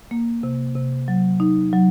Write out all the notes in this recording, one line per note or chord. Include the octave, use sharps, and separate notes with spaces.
A#3
C3
C3
F#3
D#4
F#3